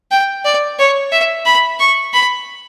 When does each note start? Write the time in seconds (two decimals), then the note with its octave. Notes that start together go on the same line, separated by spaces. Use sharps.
0.11 G5
0.45 D5
0.79 C#5
1.12 E5
1.46 B5
1.79 C#6
2.13 B5